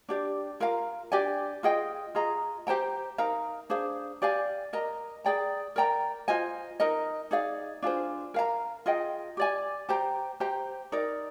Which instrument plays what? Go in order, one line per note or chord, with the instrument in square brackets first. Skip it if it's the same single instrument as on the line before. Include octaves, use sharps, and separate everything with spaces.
[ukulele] D4 G4 D5
F4 A#4 F5 A#5
D4 G4 D5 G#5
F4 G#4 D#5 G5
F4 G#4 D#5 A#5
G4 C5 G5 A#5
D#4 A#4 F5 A#5
D4 G#4 C5 F5
G4 D5 F5 G#5
A#4 D#5 A#5
G#4 D5 G5 A#5
A#4 D5 G5 A#5
F4 C5 D#5 G#5
D#4 A#4 D#5 A#5
D#4 G#4 D5 F5
D4 F4 G#4 C5
A#4 F5 A#5
F4 G#4 D#5 G5
G4 D5 G#5
G4 C5 G5 A#5
G4 C5 G5 A#5
D#4 A#4 D5